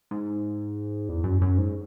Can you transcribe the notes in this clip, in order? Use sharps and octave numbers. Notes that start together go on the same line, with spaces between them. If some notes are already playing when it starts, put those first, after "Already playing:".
G#2
E2
F#2
F#2
G#2